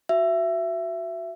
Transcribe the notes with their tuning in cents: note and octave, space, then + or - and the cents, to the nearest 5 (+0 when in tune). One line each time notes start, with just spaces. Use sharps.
F#4 +0 E5 +20